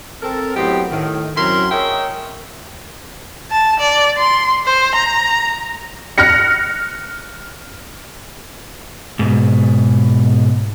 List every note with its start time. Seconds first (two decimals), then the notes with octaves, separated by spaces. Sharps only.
0.22 C4 A4 A#4
0.55 A2 F#3 B3 C4 D#4 G4
0.91 A2 D#3
1.36 F#2 F#3 C4 E4 A#4 C6
1.71 G#4 A#4 C#5 D#5 E5 G5
3.51 A5
3.80 D5
4.17 C6
4.65 C5
4.95 A#5
6.18 F6 F#6 A#6 C#7
9.19 G#2 B2